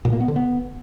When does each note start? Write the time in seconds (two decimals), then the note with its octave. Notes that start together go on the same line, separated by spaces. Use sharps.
0.05 A#2
0.13 A#3
0.20 B3
0.28 D3
0.36 B3